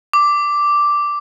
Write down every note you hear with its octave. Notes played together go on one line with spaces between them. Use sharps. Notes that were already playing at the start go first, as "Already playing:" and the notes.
D6